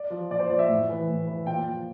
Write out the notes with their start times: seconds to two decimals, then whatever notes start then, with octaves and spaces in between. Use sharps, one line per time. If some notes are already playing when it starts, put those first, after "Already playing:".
Already playing: D5
0.10 F3
0.31 A#2 D5
0.39 C5
0.50 F3 D5
0.59 E5
0.69 A2
0.89 E3
1.08 A2
1.27 E3
1.46 A#2 G5
1.66 F3